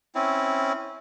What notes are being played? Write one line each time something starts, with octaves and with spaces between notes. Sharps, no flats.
C4 C#4 E4